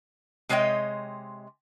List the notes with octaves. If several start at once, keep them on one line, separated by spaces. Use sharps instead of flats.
C3 G#3 C#5 D#5 G5